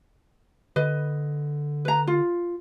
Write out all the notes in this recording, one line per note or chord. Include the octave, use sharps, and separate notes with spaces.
D3 B4 D#5
B4 A#5
F4